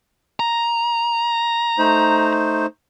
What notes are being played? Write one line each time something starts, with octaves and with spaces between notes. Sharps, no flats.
A#5
A3 D#4 C5